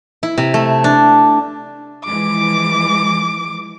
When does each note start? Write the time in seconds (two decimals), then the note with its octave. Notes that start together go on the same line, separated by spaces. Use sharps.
0.23 E4
0.38 C3
0.54 A3
0.84 D4
2.05 E3 F3 G#3 D6